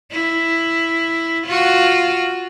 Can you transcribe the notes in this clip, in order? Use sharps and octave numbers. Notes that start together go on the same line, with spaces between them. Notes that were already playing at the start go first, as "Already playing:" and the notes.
E4
F4 F#4